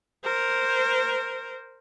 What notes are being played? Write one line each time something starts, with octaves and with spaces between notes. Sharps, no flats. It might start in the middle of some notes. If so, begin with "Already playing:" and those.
A#4 C5